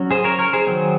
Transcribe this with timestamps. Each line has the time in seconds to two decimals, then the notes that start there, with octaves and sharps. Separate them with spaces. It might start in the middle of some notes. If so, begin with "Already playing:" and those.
Already playing: F#3 C#4
0.11 G#4 C5
0.24 A#4 C#5
0.39 A#4 C#5
0.53 G#4 C5
0.67 D#3 F#3 C4